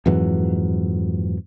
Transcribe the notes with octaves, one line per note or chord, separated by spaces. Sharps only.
F2 G#2 E3 F#3